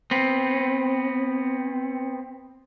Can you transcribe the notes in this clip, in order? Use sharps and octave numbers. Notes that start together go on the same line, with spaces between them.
B3 C4